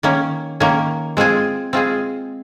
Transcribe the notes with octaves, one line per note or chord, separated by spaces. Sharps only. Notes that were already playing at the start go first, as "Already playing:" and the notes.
D#3 A#3 C#4
D#3 A#3 C#4
G#3 C4 F4 G#4
G#3 C4 F4 G#4